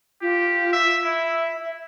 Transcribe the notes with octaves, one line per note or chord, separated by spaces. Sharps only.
F4 G4
E5
E4 E5